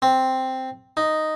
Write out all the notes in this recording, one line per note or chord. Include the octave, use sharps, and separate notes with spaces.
C4
D#4